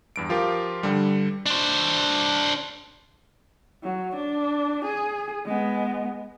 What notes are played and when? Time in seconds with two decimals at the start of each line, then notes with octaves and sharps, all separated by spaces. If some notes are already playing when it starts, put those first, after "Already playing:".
0.16 E2 G2 D7
0.29 F3 F4 G4 A#4
0.83 G2 D3 G3
1.46 D4 C5
3.83 F#3
4.16 D4
4.85 G#4
5.45 G#3 B3